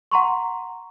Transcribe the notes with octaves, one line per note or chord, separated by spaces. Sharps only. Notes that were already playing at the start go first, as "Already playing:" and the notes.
F#5 A#5 C6 C#6